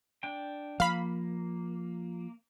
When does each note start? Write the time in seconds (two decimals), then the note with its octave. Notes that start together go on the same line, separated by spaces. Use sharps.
0.23 D4 G5
0.80 F3 A#3 F5 B5